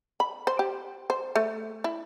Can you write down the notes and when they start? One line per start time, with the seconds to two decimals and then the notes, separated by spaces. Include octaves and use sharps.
0.20 B5
0.47 C5
0.59 G4
1.10 C5
1.36 A3
1.84 E4